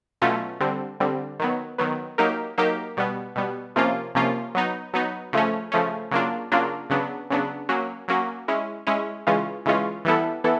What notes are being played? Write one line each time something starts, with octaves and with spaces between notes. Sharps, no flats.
B2 F#3 A3 C#4 F4
D3 G3 C4
D3 G3 C4
D#3 F#3 B3
D#3 F#3 B3
F#3 A#3 D#4 G4 A#4
F#3 A#3 D#4 G4 A#4
B2 G3 B3
B2 G3 B3
C3 F3 A#3 C#4 F4
C3 F3 A#3 C#4 F4
F#3 B3 D#4
F#3 B3 D#4
C#3 F3 A3 C#4
C#3 F3 A3 C#4
C#3 F#3 A#3 D4 F4
C#3 F#3 A#3 D4 F4
C#3 F#3 B3 D4
C#3 F#3 B3 D4
F#3 A#3 C#4 F#4
F#3 A#3 C#4 F#4
G#3 C#4 E4
G#3 C#4 E4
C#3 E3 G#3 C#4 F4
C#3 E3 G#3 C#4 F4
E3 G3 B3 E4 A4
E3 B3 E4 A4